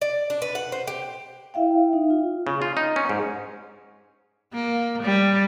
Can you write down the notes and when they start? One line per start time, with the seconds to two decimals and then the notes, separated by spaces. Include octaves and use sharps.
0.02 D5
0.30 D4
0.42 B4
0.55 F#5
0.72 C5
0.87 G4
1.54 E4 E5 F5 G5
1.93 D#4
2.10 F4
2.47 C#3
2.62 F4
2.77 D#4
2.96 C#4
3.09 G#2
4.54 A#3
5.03 G3